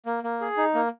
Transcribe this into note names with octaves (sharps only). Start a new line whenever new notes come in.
A#3
A#3
G#4
D#4
A#3